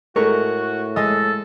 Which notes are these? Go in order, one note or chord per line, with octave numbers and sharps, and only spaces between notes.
A2 G#3 A3 F#4 A#4 C#6
G#3 A4 D#5